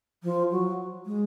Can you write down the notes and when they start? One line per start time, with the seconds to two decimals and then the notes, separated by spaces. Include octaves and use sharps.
0.24 F3
0.51 F#3
1.06 G#3